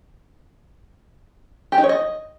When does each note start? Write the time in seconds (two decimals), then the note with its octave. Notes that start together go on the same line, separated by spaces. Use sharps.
1.72 G4
1.78 D#4
1.84 C#5
1.89 D#5